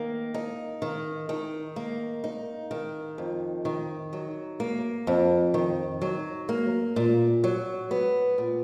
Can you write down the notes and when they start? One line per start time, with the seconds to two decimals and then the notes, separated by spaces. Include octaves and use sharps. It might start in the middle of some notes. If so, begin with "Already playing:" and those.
Already playing: D#3 A#3
0.34 D#4
0.82 D#3
1.29 D#3
1.76 A#3
2.24 D#4
2.71 D#3
3.18 F2
3.65 D#3
4.13 F#3
4.60 A#3
5.07 F2
5.54 D#3
6.02 F#3
6.49 A#3
6.96 A#2
7.44 F#3
7.91 B3
8.38 A#2